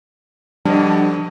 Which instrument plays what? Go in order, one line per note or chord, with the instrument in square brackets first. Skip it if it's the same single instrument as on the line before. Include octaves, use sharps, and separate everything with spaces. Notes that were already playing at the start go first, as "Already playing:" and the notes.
[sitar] G2 B2 D3 [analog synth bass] F3 [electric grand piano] G3 D#5 [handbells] D4